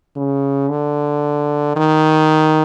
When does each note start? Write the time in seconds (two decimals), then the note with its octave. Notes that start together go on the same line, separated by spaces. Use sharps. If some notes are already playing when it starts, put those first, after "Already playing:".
0.16 C#3
0.69 D3
1.76 D#3